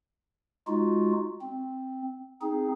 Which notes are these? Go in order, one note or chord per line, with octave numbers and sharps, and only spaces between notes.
G#3 D#4 F4 F#4
C4
C4 D#4 G#4